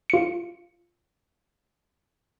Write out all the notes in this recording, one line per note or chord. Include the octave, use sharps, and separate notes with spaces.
F4 C#7